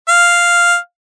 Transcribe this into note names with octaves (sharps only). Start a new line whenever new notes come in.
F5